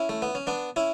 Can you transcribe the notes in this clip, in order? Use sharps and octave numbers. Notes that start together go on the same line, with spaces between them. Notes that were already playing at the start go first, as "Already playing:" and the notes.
Already playing: C#4 E4
A3
B3
C#4
B3 D4
C#4 E4